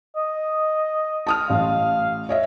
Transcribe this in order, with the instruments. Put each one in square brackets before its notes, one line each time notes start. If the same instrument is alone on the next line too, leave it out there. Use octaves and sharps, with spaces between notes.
[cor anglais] D#5
[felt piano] A5 D#6 F6
[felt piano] A1 [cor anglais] F5
[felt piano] C#5 D#5 E5